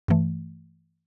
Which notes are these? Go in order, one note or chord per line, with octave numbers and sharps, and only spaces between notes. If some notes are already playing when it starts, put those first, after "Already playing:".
G2 E3 A3